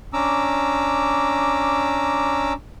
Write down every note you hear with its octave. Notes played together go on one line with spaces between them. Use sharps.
C#4 D4 A#5 D6 E6